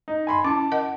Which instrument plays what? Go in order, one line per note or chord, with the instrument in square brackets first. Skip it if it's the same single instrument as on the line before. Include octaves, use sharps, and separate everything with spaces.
[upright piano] D#4
G#5 B5 C6
[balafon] C#4 E4 [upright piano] A5 D6
[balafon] A#4 D#5 F#5